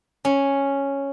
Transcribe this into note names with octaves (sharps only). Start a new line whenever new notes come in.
C#4